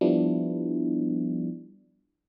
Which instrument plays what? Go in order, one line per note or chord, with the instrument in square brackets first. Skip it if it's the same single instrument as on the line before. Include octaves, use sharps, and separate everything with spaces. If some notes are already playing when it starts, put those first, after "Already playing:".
[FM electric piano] F3 G3 B3 D4 E4